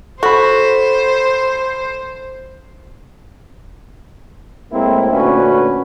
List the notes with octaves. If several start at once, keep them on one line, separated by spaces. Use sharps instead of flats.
F#4 A4 C5 B5
A2 G#3 A#3 C4 E4
D2 A#2 C#4 F#4 B4